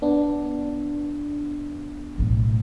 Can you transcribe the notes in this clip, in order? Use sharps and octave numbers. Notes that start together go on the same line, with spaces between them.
B3 D4
B1 A2